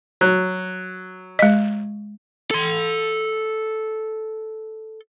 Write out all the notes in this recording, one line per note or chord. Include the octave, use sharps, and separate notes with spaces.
F#3
G#3 D#5
A4 C6